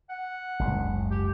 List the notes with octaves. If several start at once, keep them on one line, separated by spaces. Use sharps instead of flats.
F#5
F#1 C#2 G#2
G4